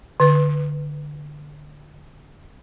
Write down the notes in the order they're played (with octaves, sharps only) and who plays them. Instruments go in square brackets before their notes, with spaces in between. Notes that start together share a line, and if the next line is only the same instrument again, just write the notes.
[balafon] D3 B4